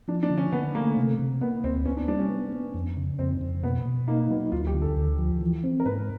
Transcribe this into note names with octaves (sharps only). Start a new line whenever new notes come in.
F3 D4
D4
D3
C#4
D3 B3
A3 A#3
C3
C3
A#3 B3
D2 C4
B3 C#4
D4
G3 D4
C#4
B3
B3
F2
C#3
F2 C4
F2
B2 B3
B2
A#3 D#4
F#3 B3
D2 F4
G4
D3
A4
D2
F3
E3
C4
A#4
G#2 B4